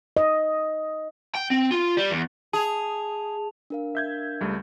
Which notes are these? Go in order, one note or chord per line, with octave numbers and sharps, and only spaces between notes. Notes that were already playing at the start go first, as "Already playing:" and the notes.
D#5
G5
C4
F4
G3
E2
G#4 A5 F7
D4 A#4 F5
E5 G6 G#6
C#2 G3 A3